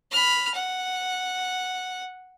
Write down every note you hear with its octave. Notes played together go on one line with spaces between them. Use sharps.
B5 F6
F#5